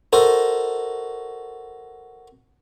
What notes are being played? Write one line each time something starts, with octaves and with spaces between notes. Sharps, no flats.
F#4 A4 A#4 C5 D#5